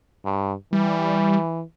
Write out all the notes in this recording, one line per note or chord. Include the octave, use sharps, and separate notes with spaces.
G2
E3 G3